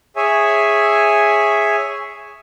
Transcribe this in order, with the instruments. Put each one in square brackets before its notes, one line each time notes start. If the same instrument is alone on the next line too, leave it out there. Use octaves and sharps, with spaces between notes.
[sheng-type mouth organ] G#4 C#5 E5 G#5